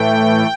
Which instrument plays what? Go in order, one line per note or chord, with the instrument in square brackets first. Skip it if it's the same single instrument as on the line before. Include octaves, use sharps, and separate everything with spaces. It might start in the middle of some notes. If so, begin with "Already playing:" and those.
Already playing: [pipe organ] A2 E3 A3 G5